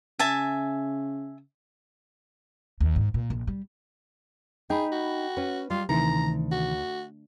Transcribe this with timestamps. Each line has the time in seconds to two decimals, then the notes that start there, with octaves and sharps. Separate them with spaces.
0.19 C#3 E5 G#5 A5
2.80 D#2
2.96 G#2
3.14 A#2
3.30 A#1
3.47 G3
4.70 D#4 G#4 G5 B5
4.92 F#4
5.37 C#4 B4
5.70 G3 F4
5.89 D2 C3 D#3 E3 A#5
6.52 F#4